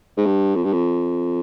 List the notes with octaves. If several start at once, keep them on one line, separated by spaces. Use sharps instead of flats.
G#2
G2
F2
G2
F2